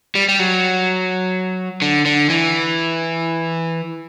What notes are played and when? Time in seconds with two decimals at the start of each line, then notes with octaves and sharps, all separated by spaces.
0.15 G3
0.28 G3
0.39 F#3
1.82 D3
2.06 D3
2.30 E3